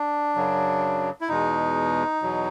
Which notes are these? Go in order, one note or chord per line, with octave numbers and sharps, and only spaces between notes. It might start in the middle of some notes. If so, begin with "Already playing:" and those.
Already playing: D4
F#2 C#3 F#3
E4
E2 B2 G#3 D#4
E2 B2 F#3